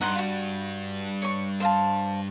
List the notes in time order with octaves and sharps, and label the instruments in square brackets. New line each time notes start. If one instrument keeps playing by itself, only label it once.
[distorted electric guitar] G2 [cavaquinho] D#4 F#5 C6
[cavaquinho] F4 F#4
C#5 C#6
C5 F5 A5